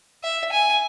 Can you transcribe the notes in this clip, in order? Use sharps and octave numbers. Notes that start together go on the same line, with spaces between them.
E5
G#5